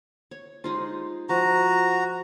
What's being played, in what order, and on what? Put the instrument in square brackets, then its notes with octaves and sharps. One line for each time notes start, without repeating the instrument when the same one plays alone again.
[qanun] C#5
[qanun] G#3 D#4 F4 [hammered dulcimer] C5
[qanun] F3 [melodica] F#4 A#5